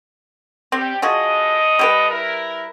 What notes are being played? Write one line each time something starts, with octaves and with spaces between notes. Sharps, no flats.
G3 C4 G4
D3 F3 F#4 G#4 D#5
G3 G4 B4
E4 A#4